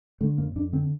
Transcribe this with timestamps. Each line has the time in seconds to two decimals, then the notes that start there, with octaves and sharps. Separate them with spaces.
0.21 D3 A3
0.38 F2 A#3
0.56 F2 D4
0.73 D3 C4